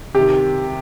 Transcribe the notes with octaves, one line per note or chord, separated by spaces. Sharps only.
C3 D#3 G4